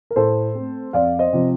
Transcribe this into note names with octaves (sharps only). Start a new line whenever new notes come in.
A#4
A2 A4 C5
A3 C4
F2 D5 F5
C5 D#5
C3 F3